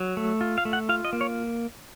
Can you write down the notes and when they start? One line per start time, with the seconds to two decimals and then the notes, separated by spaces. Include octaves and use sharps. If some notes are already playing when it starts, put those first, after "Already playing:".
Already playing: F#3
0.17 A3
0.41 F4
0.58 F5
0.65 A3
0.73 F#5
0.89 F4 F5
1.05 D#5
1.13 A#3
1.21 C#5